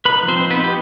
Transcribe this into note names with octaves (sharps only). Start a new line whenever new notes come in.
D#4 B4 B5
F3
C4 C5
D#4
B3 B4
D#4
G4